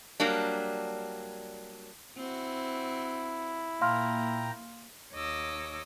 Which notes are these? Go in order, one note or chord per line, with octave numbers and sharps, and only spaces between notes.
F#3 G3 A#3 D4
C4 E4 F#4
A#2 A#3 F5 G5 A#5 C6 F6
D#2 C#5 D#5 D6 E6